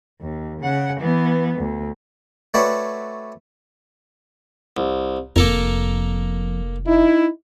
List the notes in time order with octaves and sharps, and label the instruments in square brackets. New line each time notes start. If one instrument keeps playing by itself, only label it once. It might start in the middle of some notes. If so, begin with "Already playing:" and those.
[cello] D#2
C#3 F#5
E3 B3
D2
[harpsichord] A3 C4 F#4 B4 C#5 D5
C2
[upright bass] F1 [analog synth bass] F2 [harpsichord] A#3 A4 A#4
[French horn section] D#4 E4